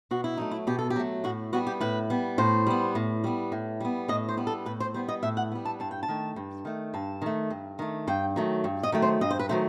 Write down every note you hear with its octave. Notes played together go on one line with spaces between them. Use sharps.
B2 F#4
E4
F#3 A3 D#4
E4
B2 G4
A4
G4
F#3 A3
A2 F#4
G3 B3 F#4
G4
A2 B4
G3 B3
A2 C5
G3 B3
A2
G3 B3
A2
G3 B3
A2 D#5
C5
G3 B3
A4
A2 B4
C5
G3 B3 C5
D#5
A2 E5
F#5
G3 B3
A5
G2 A5
G5
A5
D#3 A3
G2
D#3 A3
G2 A5
D#3 A3
G2
D#3 A3
G2 G5
D#3 F#3 A3
G2
D#5
D#3 F#3 A3
C5
G2 D#5
C5
B4
D#3 F#3 A3 C5